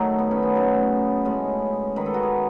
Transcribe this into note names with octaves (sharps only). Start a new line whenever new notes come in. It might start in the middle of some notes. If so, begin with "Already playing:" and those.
Already playing: D#3 F#3 A3 D#4
B3
C#4
B3
C#3 F#3 A3
A2 G#3 C#4
D#3 G#3 B4
A4
F#4
G#4